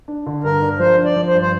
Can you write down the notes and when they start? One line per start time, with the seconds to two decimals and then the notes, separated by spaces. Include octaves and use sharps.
0.08 D4
0.26 D3
0.44 G2 A#4
0.62 D4
0.79 F3 C5
0.98 D4
1.04 D5
1.16 F3
1.27 C5
1.34 G2
1.41 C5